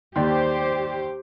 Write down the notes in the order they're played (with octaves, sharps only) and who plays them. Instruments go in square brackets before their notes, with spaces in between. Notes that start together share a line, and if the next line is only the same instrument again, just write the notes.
[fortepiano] D#2 [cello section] G4 C5 [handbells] D5 G5 C6